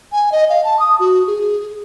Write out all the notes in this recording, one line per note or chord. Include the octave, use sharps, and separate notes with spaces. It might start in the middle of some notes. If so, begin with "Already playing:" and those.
G#5
D#5
F5
A5
D#6
F#4
G#4